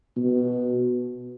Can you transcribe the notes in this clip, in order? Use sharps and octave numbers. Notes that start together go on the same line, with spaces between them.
B2